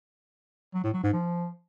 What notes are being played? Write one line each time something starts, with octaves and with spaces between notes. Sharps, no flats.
F#3
A2
F#3
G#2
F3